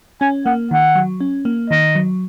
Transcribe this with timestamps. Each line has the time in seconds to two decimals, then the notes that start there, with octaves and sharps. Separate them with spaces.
0.21 C#4 G#5
0.46 A#3 F#5
0.71 D#3 F#5
0.95 F#3
1.20 C#4
1.45 A#3
1.70 D#3 D#5
1.95 F#3